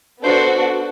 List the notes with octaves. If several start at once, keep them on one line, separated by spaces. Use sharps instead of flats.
B3 D4 F#4 A4 C5